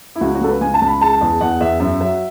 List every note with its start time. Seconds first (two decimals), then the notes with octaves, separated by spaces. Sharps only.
0.16 E4
0.21 C#2 F#4
0.35 F#4
0.41 C#2 A4
0.48 B4
0.61 C#2 G#5
0.74 A5
0.82 C#2
0.88 B5
1.01 G#3 A5
1.21 E2
1.41 E2 F#5
1.60 E2 E5
1.80 F#2 E5
2.00 F#3 E5